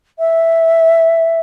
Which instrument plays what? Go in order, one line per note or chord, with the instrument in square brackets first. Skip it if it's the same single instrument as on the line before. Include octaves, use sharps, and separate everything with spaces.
[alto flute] E5